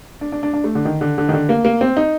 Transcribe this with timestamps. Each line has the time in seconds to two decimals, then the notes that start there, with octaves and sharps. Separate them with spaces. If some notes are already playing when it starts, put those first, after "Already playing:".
0.21 D4
0.32 D4
0.43 D4
0.54 D4
0.64 A3
0.75 D3
0.85 D#3
1.01 D3
1.18 D3
1.29 D#3
1.33 D3
1.49 A#3
1.65 A#3
1.81 C4
1.97 D#4